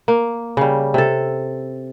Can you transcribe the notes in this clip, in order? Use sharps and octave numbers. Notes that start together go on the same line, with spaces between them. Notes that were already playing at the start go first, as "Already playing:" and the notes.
A#3
C#3 G3
C3 A4